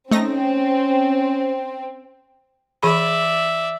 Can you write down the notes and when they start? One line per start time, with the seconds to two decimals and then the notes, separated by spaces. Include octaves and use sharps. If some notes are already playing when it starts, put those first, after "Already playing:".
0.12 A3 C4 C#4 D#4 A#6
2.83 E3 G#4 D5 E5 B5